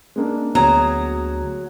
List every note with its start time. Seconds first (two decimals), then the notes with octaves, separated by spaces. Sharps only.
0.16 G#3 A#3 D4
0.55 D2 F#3 B3 G#4 A#5